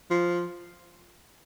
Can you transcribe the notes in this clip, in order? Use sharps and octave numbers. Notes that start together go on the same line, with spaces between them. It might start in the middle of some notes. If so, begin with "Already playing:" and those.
F3